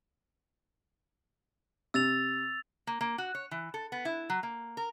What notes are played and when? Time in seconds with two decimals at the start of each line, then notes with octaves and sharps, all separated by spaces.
1.94 C3 E6 A6 F7
2.87 A#3
3.01 A#3
3.18 F#4
3.35 C#5
3.51 E3
3.74 A4
3.92 B3
4.05 E4
4.30 F#3
4.43 A#3
4.77 A#4